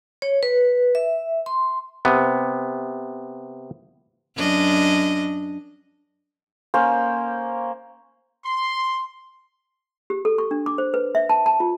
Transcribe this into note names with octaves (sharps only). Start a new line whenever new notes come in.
C#5
B4
E5
C6
C3 B3
F#2 D4 D#5
A#3 C#4 C5
C6
G4
A4
C#6
D4
D6
C5
B4
E5
A5
A5
F4